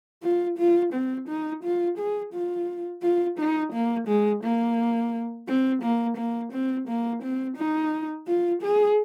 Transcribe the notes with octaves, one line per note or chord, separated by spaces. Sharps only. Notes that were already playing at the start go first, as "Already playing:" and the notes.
F4
F4
C4
D#4
F4
G#4
F4
F4
D#4
A#3
G#3
A#3
C4
A#3
A#3
C4
A#3
C4
D#4
F4
G#4